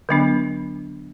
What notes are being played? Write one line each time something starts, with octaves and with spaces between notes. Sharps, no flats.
D3 F#3 B3 D4